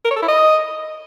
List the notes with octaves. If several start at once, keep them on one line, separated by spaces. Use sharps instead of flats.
A#4
C#5
A4
E4
D#5